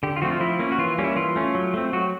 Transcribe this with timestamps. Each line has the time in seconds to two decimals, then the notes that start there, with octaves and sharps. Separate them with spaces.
0.03 D3 G4
0.16 F4
0.22 F3 A3 C4 F#4
0.31 F4
0.40 F3 E4
0.60 A#3 C#4
0.72 F#4
0.78 E3 F4
0.98 G3 A#3 C#4
1.04 E4
1.16 E3 F4
1.36 A3 C#4
1.55 F#3
1.74 A3 C4
1.93 F#3 F#4